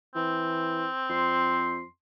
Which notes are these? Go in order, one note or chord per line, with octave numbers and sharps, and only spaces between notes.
E3 C4
F2 C6